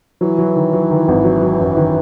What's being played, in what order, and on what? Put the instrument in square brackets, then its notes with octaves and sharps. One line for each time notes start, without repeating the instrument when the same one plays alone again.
[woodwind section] E3 [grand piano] F#3
[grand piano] F#3
D#3
F#3
D#3
G#1
F#3
F#3
F#2
D#3